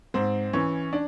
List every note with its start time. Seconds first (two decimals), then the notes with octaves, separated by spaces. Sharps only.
0.14 G#2 C4
0.53 E3 C#4
0.93 D4